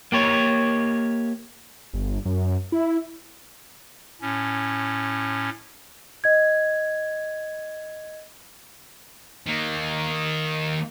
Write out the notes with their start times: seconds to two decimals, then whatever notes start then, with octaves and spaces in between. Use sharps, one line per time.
0.12 A#3 G4 C#5
1.94 G1
2.25 F#2
2.72 E4
4.21 A2 C#4
6.24 D#5 G#6
9.47 D#3 A#3